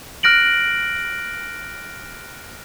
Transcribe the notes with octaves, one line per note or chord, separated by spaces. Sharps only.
F6 F#6 A#6 D7 F#7